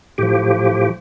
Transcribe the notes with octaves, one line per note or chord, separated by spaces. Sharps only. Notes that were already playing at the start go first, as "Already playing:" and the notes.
A2 F3 G4